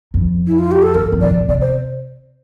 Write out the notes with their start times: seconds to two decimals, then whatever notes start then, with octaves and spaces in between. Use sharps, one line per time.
0.14 F2
0.47 E4
0.59 F4
0.71 G4
0.83 A4
0.95 G2 A#4
1.12 F2
1.21 A#2 D5
1.30 A2
1.48 C3 D5
1.61 C5